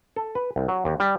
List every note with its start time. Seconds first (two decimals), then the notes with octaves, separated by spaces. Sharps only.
0.16 A4
0.35 B4
0.56 C2
0.68 F#3
0.85 D#2
1.00 G3